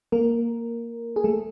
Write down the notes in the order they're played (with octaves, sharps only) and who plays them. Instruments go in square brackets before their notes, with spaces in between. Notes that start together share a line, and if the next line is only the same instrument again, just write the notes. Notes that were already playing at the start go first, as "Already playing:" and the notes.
[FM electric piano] A#3 A#4
G#4
A3 A4